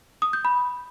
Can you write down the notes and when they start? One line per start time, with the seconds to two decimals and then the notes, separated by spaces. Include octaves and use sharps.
0.22 D#6
0.33 G6
0.45 B5